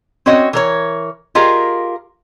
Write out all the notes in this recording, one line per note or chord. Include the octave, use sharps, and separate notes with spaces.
C4 C#4 F#4 C#5 D#5
E3 A#4 C#5
F4 G4 G#4 A#4 D#5 F5